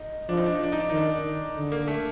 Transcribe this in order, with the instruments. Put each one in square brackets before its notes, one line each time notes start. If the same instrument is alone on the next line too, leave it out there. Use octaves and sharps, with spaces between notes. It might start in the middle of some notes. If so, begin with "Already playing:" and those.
Already playing: [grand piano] D#4
[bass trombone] F3 [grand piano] D4
[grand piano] D#4
D4
D#4
D4
D#4
D4
[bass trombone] D#3 [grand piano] D#4
[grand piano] D4
[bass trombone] D3
[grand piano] A#3
A3